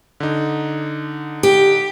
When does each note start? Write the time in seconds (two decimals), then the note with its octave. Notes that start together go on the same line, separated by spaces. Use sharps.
0.20 D3 D#4
1.43 G4